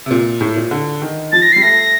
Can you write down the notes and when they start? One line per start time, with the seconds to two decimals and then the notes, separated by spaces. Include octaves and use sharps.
0.06 C3
0.11 A#2
0.41 A2
0.56 A#2
0.71 D3
1.02 D#3
1.32 F3 A6
1.42 A#6
1.52 C7
1.56 G3
1.62 A3 A#6